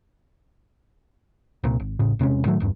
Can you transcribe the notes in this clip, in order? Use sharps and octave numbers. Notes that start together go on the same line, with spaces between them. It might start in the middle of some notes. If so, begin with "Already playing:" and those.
C2 A#2
G#1
A1 A2 C#3
E1 C3 G#3 C#4
A2 D#3 F#3 A3
G#1 E2 G2